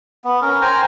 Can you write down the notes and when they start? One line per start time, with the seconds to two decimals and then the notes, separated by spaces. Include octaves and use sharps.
0.25 B3
0.42 C#4 A#4
0.61 C5 G5 G#5 A#5